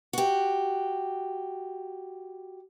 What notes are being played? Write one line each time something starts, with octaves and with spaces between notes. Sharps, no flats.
F#4 G4